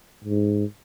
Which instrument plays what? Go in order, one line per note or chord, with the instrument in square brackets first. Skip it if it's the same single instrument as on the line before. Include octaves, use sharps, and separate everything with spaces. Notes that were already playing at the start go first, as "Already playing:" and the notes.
[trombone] G#2